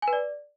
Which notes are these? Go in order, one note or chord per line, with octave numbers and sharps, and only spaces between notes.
G#5
B4
D5